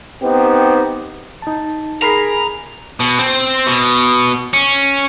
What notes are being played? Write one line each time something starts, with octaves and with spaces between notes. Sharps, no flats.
B3 C4 D#4 G4
D#4 A5
G#4 A#4 A#5 B5 C7
B2
C4
B2
C#4